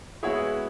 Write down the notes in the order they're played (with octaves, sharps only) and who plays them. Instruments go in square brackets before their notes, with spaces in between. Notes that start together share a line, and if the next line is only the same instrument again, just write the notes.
[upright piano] G#3 B3 F#4 C#5 [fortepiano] E4 G#4